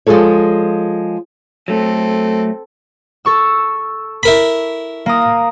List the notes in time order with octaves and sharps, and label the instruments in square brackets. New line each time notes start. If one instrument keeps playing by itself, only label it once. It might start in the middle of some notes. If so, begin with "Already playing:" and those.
[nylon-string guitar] F3 G#3 F4 G#4 A4 C#5
[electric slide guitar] F#3 A3 [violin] C4 A4
[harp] A4 C#6 E6
[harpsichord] E4 A#4 B5
[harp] A#3 A#5 D#6